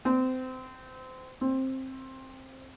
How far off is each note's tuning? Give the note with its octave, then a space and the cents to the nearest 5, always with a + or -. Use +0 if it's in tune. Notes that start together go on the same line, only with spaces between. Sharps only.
C4 -25
C4 +15